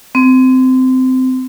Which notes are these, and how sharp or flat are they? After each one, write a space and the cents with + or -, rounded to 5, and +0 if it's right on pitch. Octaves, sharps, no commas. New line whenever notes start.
C4 -20